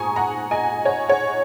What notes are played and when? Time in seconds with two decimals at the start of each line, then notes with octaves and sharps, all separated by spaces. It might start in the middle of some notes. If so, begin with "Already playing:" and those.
Already playing: G#2 G#5 A#5 C#6 D#6
0.16 F#5 A#5
0.51 D#5 G#5
0.85 C#5 F#5
1.09 C#5 F#5